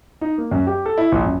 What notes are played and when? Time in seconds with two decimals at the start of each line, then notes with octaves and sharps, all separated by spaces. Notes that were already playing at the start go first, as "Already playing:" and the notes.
0.21 D#4
0.38 A#3
0.51 F#2
0.67 G4
0.86 A4
0.98 E4
1.12 A#1
1.24 F#2